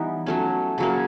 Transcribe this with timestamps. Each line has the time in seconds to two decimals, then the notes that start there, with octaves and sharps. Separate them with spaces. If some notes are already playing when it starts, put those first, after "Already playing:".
Already playing: E3 G3 B3 D#4
0.27 F#3 A3 C#4
0.78 C#3 F#3 A#3